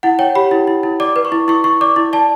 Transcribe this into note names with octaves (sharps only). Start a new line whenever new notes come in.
E4 F#5
C#5 G5
G4 B5
E4
E4
E4
D5 D6
B4
C#6
E4
E4 C#6
E4 C#6
D5 D6
E4
D5 A5